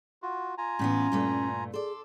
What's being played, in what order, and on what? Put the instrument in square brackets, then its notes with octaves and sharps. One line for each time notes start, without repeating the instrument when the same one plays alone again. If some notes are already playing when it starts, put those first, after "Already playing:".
[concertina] F4 F#4
F4 G#5 A#5
[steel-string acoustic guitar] A2 E3 B3 [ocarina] C#4
[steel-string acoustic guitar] G2 A#2 A3
[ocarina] G#4 [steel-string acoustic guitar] A4 D5 [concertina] C6